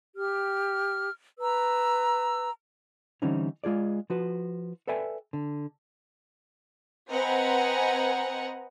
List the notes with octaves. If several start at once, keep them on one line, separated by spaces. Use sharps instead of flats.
G4 F6
B4 A#5 E6
D3 E3 G3 C4 C#4 D#4
G#3 F4 G#4 D5
F3 F#4 B4
A4 B4 D5 E5 G5 G#5
D3
C4 B4 D#5 F#5 G#5 A#5